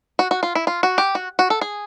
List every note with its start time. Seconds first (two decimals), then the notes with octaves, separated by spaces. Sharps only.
0.19 F#4
0.31 F#4
0.43 F4
0.55 E4
0.67 F4
0.83 F#4
0.98 G4
1.15 F#4
1.39 F#4
1.50 A4
1.61 G#4